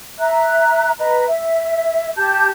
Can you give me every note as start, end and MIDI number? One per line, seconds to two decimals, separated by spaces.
0.19 0.92 76
0.19 0.92 82
0.19 0.92 90
0.98 1.26 71
0.98 1.26 75
0.98 1.26 82
1.27 2.12 76
2.18 2.50 67
2.18 2.50 81
2.18 2.50 91